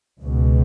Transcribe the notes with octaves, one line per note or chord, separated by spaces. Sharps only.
C#2 B2